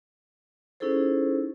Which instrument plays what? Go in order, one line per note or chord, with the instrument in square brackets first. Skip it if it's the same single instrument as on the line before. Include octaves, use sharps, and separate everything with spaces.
[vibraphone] C#4 D#4 E4 G#4 A4 C5